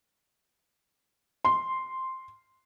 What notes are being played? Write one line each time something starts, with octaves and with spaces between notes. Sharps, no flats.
C6